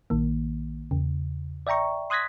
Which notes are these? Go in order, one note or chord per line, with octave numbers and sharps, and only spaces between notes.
A#1 D#3 A#3
E2 C#3
D5 E5 G5 A#5 C#6
C6 D#6 F#6 G#6 A#6 B6